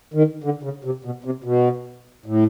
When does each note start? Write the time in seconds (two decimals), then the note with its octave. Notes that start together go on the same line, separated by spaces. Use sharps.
0.14 D#3
0.44 D3
0.63 C#3
0.84 C3
1.05 B2
1.24 C3
1.44 B2
2.26 A2